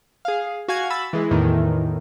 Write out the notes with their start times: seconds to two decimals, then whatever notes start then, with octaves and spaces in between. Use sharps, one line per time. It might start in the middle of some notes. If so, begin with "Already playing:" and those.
0.25 G#4 F5
0.68 F#4 F5 G#5 G#6
0.90 B5 E6 A6
1.13 E3 G#3
1.31 E2 A2 D#3 E3